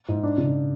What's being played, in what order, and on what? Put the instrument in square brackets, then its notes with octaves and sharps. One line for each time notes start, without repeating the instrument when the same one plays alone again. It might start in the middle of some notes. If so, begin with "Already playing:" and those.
[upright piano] G#2
D4
C#3